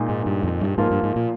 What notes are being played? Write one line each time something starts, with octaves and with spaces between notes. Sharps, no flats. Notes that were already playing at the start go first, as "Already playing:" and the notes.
Already playing: A#2 G#3 D#4
G#2
G2
F2
G2
G#2 F3 A#3 F4
G2
G#2
A#2